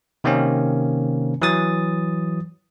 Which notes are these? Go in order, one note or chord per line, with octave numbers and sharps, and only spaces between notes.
C3 D#3 A#3 C4 C#4
E3 F#3 D#6 A6